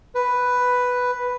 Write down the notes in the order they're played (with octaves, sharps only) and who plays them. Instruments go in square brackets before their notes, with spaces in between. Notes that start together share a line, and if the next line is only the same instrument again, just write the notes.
[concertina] B4